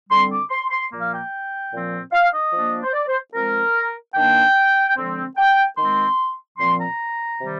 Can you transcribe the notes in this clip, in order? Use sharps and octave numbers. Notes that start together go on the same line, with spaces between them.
D3 G3 C4 C6
D6
C6
C6
A#2 F3 A#3
F5
G5
A#2 F3 C4
F5
D#5
F3 A#3 D4
C5
D5
C5
F3 G#3 C4 A#4
D#3 A#3 D4 G5
D3 F3 G#3 C4
G5
D#3 G#3 C4 C6
A#2 F3 C4 C6
A#5
C3 D#3 G3